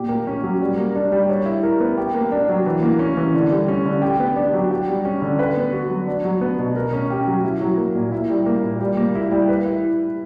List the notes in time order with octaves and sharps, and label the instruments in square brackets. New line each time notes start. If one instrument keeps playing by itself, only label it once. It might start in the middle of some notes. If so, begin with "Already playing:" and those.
Already playing: [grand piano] A#2 G4
A#3
C#4
F#3
G3
A#3
D4
G3
C#5
E4
A#4
B3
G4
A#3
D4
F#3
E3
A#3
C#4
E3
D3
G3
C#4
D3
G4
B3
D4
F#3
G4
G3
C#4
D3
B4
B3
F#4
F#3
D4
F#3
B3
B2
A#4
C#4
G4
F#3
E4
F#3
A#3
A#2
E4
G3
A#3
A#2
G3
A#3
E4
G3
B4
E4